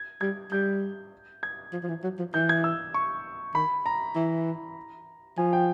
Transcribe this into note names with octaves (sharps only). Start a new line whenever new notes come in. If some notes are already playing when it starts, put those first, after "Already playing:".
Already playing: G#6
G3 G#6
G3 G6
G#6
F3
F3
E3
F#3
F3
E3 G6
G#6
E6
C#6
D#3 B5
A#5
E3
F3 G#5
G5